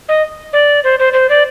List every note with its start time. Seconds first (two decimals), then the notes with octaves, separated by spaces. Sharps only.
0.09 D#5
0.53 D5
0.84 C5
0.99 C5
1.13 C5
1.29 D5